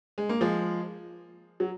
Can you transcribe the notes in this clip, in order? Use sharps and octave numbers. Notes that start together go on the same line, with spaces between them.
G#3
A#3
F3 G#3
F#3